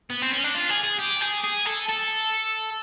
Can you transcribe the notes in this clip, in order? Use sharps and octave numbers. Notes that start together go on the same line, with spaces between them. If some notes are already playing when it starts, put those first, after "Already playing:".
B3
C4
C#4
D4
F4
G#4
G#4
G4
G#4
G#4
A4
A4